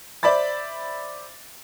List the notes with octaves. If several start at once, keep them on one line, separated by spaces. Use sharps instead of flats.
C5 D5 E5 B5 A6